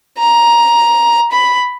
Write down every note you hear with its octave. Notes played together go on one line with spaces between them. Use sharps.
A#5
B5